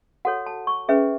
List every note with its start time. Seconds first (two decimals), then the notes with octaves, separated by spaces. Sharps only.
0.25 F#4 A4 C#5 F#5
0.46 A5
0.67 C#6
0.88 C#4 G#4 B4 E5